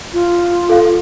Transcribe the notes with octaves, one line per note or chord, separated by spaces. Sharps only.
F4
A4 F5